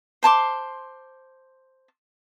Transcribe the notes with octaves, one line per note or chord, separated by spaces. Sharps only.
C5 A5 C6 D6